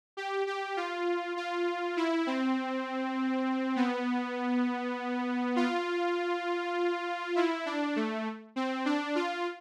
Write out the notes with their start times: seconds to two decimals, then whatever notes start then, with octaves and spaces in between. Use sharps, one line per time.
0.17 G4
0.47 G4
0.77 F4
1.37 F4
1.97 E4
2.27 C4
3.76 B3
5.56 F4
7.36 E4
7.66 D4
7.96 A3
8.56 C4
8.85 D4
9.15 F4